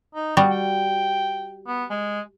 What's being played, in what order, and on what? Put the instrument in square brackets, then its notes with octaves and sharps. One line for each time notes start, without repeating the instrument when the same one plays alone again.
[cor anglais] D#4
[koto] G3 F#4 [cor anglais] B3
[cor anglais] G5
B3
G#3